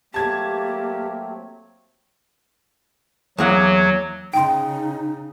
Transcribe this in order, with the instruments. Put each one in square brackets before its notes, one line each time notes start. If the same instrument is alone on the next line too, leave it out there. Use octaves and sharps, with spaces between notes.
[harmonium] F#3 A3 C4 [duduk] A#3 [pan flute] G4 [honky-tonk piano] A5 G#6
[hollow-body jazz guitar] E2 A#3 F#5 [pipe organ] F#3
[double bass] C#3 [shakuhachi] D#4 [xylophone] G5 C6